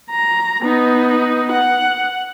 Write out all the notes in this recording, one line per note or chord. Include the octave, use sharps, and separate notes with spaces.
A#5
B3 D#4
F#5